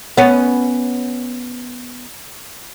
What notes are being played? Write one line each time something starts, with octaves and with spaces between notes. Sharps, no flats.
B3 C#4